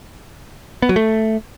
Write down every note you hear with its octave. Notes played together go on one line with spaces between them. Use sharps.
B3
F#3
A3